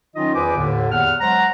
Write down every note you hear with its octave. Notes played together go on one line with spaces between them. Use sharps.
D#3 F#3 C#4 D#4 F4 D#5
E2 F4 B4 C5 G#5 D6
D#2 A2 D3
E2 F#5 F6
F#3 G#3 C5 F#5 A#5